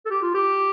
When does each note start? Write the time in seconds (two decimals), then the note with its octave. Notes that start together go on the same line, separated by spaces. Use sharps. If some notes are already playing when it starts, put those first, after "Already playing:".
0.06 A4
0.11 G4
0.22 F4
0.35 G4